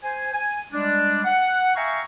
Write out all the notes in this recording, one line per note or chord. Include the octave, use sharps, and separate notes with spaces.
C5 G#5
G#5
G3 G#3 D4
F#5
E5 F5 G5 G#5 A#5 C#6